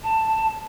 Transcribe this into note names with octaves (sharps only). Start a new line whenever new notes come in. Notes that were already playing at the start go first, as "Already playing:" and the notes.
A5